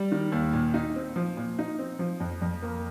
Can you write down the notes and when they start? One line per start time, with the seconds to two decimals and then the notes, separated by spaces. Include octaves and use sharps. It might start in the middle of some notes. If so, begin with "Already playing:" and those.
Already playing: G3
0.12 D#3
0.32 D#2
0.53 A#2
0.74 D#4
0.96 C4
1.16 F3
1.37 A#2
1.59 D#4
1.79 C4
1.99 F3
2.20 F2
2.42 F2
2.62 A#3